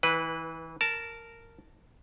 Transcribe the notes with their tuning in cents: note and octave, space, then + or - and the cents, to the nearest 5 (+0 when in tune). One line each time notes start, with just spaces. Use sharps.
E3 -25 B4 +0
A#4 -10 A5 +0